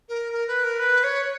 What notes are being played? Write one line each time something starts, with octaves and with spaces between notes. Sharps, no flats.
A#4
A#4
B4
A#4
B4
C#5